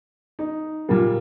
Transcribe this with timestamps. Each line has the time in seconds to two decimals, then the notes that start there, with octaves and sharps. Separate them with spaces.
0.39 D#4
0.89 A#2 G3 A#3